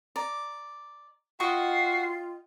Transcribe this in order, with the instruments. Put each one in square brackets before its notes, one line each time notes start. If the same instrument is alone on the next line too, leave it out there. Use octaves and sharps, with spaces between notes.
[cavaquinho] D5 A#5
[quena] F4 [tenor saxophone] F#4 [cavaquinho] D#5 G5 C#6 [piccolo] C7